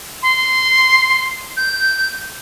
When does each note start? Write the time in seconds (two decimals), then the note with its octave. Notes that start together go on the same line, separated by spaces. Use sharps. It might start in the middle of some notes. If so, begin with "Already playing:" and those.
0.22 C6
1.57 G6